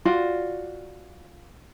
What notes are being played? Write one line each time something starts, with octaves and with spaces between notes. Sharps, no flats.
F4 F#4 D5